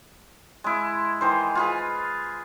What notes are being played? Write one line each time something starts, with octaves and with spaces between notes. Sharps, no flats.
G#3 E4
D#3 E3 C5
F4 G#4 B4